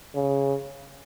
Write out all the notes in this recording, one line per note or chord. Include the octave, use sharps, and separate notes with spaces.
C#3